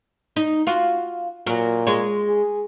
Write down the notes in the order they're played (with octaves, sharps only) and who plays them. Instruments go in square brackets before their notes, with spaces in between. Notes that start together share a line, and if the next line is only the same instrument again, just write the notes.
[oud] D#4
F4 F#4
[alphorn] A#2 [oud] F#3 A#4
[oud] G#3 C#5
[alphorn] G#4